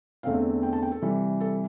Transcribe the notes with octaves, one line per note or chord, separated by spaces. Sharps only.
E2 D3 A3 C4 F5
G5
A5
G5
A4
C3 E3 G3
A4